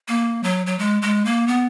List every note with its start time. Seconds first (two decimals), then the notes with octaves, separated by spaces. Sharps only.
0.08 A#3
0.43 F#3
0.66 F#3
0.79 G#3
1.02 G#3
1.25 A#3
1.47 B3